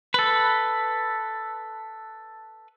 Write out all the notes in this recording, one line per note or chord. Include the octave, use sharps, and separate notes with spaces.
A4 B4